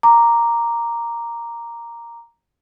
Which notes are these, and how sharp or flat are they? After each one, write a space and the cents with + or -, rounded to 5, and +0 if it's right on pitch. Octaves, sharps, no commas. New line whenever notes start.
A#5 +0 D6 +0